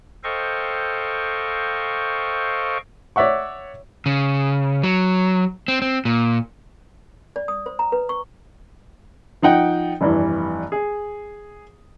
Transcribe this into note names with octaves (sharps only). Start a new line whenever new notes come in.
A4 C5 D#5 F5 G5 C#6
C#5 D5 E5 F#5 C#6
C#3
F#3
C4
C4
A#2
D5
D#6
C5
A#5
B4
C#6
F3 D#4 F#5 G5
F1 G2 E3
G#4